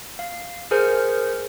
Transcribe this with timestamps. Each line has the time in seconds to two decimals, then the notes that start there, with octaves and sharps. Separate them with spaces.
0.19 F5
0.71 G#4 A#4 C5 G#5 F6 G6